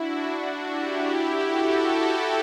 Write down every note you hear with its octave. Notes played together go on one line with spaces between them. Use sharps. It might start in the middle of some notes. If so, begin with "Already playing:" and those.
Already playing: D4 E4 F#4
D4 F#4
E4 G4
E4 G4
F#4 A4